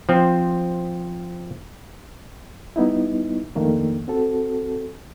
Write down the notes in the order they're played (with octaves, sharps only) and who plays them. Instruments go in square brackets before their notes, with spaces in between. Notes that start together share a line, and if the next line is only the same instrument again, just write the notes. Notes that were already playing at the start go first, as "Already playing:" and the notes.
[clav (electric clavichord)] F3 C4
[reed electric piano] G3 B3 D#4 E4
F2 D#3 A3 A#3 D4
C4 F#4 A4